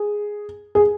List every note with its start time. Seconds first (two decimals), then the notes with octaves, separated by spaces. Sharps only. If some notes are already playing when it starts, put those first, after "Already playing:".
Already playing: G#4
0.75 G#4